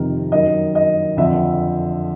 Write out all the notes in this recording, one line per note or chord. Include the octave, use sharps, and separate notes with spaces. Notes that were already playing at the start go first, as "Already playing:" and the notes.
Already playing: F2 C3 D#3 A#4
F#2 D#3 D#5
D#5
F2 D3 E5